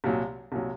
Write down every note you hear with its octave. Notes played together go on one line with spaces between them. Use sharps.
C2 A#2 F#3
C2 A#2 F#3